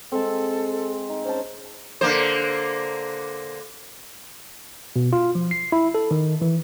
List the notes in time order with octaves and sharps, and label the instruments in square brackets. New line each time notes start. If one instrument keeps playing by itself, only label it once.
[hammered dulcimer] G#3 C4 [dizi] A4
[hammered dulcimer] D#4
[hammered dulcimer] C#4 A5 [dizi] C5
[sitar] D3 A#3 C5
[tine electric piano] B2
F4
F3
C7
E4
A4
D#3
E3